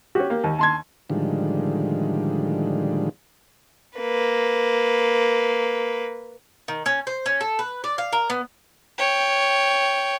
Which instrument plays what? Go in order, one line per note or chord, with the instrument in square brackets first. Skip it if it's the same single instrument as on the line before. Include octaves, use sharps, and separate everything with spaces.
[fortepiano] C#4 F#4 [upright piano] G4
[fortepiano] A#3
D#2
[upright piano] A5 C6 G#6
[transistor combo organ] A2 D3 D#3 F3 G3 G#3
[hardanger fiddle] A#3 B4
[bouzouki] D#3
C#4
C5
C#4
A4
B4
D5
F5
A#4
B3
[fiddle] C#5 G5